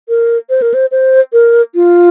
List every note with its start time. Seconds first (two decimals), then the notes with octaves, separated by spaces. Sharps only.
0.09 A#4
0.50 C5
0.62 A#4
0.74 C5
0.91 C5
1.33 A#4
1.75 F4